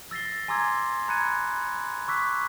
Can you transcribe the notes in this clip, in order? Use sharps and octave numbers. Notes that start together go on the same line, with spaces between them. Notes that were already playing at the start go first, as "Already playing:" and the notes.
E6 A6 A#6 C7 G7
G#5 A#5 C6 D6 E6 G#6
A#5 B5 F#6 G#6 C#7 D#7
C#6 D6 E6 F#6 B6